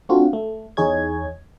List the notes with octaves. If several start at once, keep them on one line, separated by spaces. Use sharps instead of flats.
A3 C4 D4 F4 F#4
A3
E2 D#4 G#4 C#5 G#6